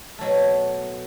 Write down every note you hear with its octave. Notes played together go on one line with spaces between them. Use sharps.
B2 F#3 A3